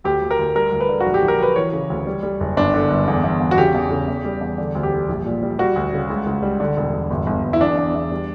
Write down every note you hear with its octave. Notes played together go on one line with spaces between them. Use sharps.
D2 G4
D2
A#4
D2
G3 A#4
D2
B4
D3
F#4
A#1
G4
A#1
A#4
F#3 B4
E3 C#5
C#3
D2
G3
G3
F#1
G1 D4
D3
G1
E2
E2
E2
F#4
C#3 G4
E2
C#3
E2
G3
E2
D3
D2
G4
G3
A#1
A#2
G3
G3 F#4
D2
C#3
C#2
C#2
G3
D3
E1
E1
G1
G1
G1
E4
E2 D4
E2
E2
G3